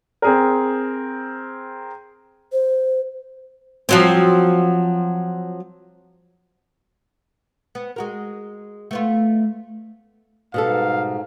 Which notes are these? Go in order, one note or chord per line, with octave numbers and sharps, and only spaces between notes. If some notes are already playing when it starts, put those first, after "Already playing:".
C4 G#4 A#4
C5
F3 F#3 C4
B3
G#3 F#4 A#4
A3 B3 F4
G#2 B2 G3 A4 F5